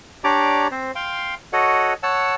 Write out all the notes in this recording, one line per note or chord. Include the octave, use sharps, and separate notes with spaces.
D4 G4 C#5 D5 A#5 D6
C4 C5
F5 G5 C6
F#4 A4 C#5 D#5 F#5
C#5 F#5 A5 E6